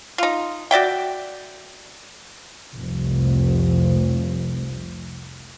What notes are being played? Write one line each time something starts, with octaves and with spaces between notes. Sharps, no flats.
D#4 F4
F#4 D5 E5 G5
F1 C2